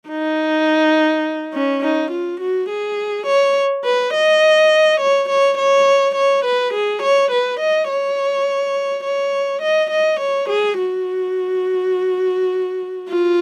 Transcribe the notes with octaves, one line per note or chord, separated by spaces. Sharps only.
D#4
C#4
D#4
F4
F#4
G#4
C#5
B4
D#5
C#5
C#5
C#5
C#5
B4
G#4
C#5
B4
D#5
C#5
C#5
D#5
D#5
C#5
G#4
F#4
F4